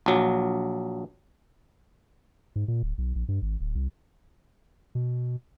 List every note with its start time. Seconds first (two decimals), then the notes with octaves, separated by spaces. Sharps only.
0.06 A#1 F#3
2.56 G#2
2.68 A#2
2.83 D1
2.98 B1
3.15 A#1
3.28 G2
3.42 G#1
3.61 D1
3.75 C2
4.95 B2